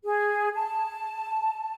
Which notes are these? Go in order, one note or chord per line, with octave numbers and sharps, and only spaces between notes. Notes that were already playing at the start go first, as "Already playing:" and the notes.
G#4
A5